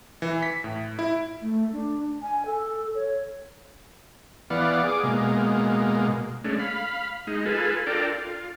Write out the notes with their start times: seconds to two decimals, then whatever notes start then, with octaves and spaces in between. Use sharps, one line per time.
0.22 E3
0.43 B6
0.64 A2
0.99 E4
1.42 A3
1.73 D4
2.22 G#5
2.46 A4
2.95 C#5
4.50 E3 B3 D5 F5 F#5
4.84 G#4 D6
5.03 B2 G#3 A#3
6.44 G#3 A3 C#4 D4
6.59 F5 B5
7.27 G#3 D#4
7.46 F4 G#4 A4 B4
7.87 D4 F4 A4 A#4 D5 G5
8.19 F4